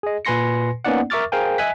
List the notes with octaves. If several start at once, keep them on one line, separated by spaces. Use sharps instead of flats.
G#4 D#5
A#2 B4 G#5 C6 A#6 C#7
A#3 B3 C#4 D#4 D5 F#5
A#4 E5 C#6 D6 F6 A6
G#4 A#4 C5 F5 G5 G#5
D#5 E5 G#5 F#6 B6